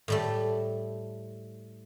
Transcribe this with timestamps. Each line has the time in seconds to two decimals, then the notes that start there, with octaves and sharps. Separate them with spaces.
0.08 A2 G3 A3